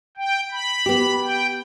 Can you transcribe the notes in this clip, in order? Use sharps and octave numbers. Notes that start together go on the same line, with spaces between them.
G5
B5
B3 G4
G5